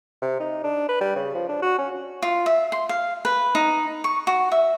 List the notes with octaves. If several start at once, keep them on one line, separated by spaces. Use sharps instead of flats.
C3
D#4
D4
B4
G3
C#3
F3
D4
F#4
C#4
F4
E5
C6
F5
B4
D#4
C#6
F#4
E5